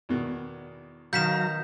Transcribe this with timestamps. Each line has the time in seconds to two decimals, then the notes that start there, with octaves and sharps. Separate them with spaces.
0.09 E2 B2 D#3
1.13 B2 D#3 F#3 F5 A#5 G6 B6 E7